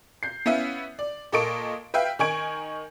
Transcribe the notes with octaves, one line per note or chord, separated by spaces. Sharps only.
G6 C7
B3 C#4 E4 B4 E5 F5
D5
A#2 A#3 A4 D#5 C#6 D7
B4 E5 F5 G5
D#3 D#4 G#5 C#6 G#6 D7